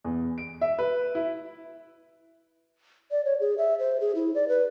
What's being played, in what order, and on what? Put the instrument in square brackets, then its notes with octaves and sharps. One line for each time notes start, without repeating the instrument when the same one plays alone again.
[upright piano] E2
D7
E5
B4
E4
[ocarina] D5
C#5
G#4
E5
C5
G#4
E4
D5
B4